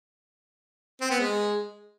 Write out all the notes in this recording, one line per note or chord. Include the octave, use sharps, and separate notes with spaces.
C4
B3
G#3